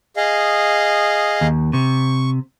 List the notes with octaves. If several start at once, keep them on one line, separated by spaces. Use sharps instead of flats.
G#4 D#5 F5
D#2
C3 C#6